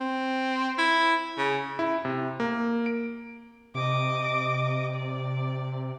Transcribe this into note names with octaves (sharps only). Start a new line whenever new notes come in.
C4
E4
C#3
E4
C3
A#3
D7
C3 D#5 D6
D5